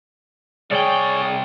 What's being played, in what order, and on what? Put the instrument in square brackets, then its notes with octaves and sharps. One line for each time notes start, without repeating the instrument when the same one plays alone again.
[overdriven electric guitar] C2 G5 [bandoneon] G#4 C#5 [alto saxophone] D5